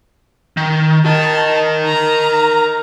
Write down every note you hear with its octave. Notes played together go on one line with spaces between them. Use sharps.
D#3
A#4 D#5 A5
A#5